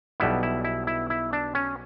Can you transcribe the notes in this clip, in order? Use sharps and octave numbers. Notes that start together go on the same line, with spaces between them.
B1 B2 G3 B3 E4
E4
E4
E4
E4
D4
C#4